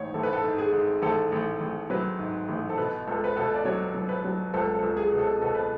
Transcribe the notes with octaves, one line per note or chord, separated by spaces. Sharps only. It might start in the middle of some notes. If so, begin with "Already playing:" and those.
Already playing: A1 G#2 C#5
A1 A4
B4
A4
G#2
G#4
G#2
A1 A4
A1
A1
F#3 B4
G#2
A1
A4
B2 B4
C#2 A4
B4
B2 A4
D5
F#3 C#5
F#3
B4
F#3
C#2 A4
A4
C#2
G#4
B2
A4
B2 A4
B4